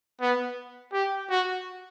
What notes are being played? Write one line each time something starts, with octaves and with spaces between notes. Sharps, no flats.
B3
G4
F#4